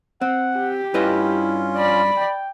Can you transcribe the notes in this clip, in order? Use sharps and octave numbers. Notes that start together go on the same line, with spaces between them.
C4 F#5
G4
G2 C#4 E4 F4 B4 D#5
D5 B5
G5